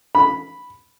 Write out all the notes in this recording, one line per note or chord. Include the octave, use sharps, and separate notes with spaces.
B5